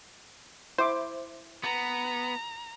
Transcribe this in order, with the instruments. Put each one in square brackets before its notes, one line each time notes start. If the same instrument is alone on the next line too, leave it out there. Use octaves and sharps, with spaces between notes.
[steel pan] E4 E5 D6 [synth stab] C5
[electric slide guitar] B3 [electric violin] A#5